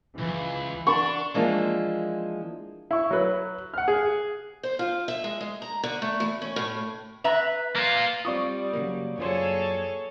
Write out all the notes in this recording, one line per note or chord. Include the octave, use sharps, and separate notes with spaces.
C#2 E3
D4 C#6
E3 F3 G#3 A#3 D4 F4
E4 C#6
F#3 B4
F#5 F6
G#4
C5
F4
E5
G#3
G#3
A#5
D3
A3
E3
C#4
A2
B4 E5 A#5
A#3 F4
G3 C4 F4 D5 C#6 D#6
C#3 F#3 A#3
F#2 A#3 F4 G#4 A4 C5 C#5